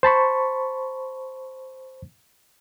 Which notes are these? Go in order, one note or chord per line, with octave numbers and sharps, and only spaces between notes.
C5 A5 B5 C#6